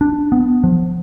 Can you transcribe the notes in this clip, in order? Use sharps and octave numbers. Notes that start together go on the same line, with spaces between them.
D4
B3
F3